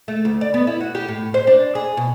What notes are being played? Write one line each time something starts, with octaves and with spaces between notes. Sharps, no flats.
A3
D2
D5
B3
E4
F#4
G4
A2
C5
D4
G#4
B2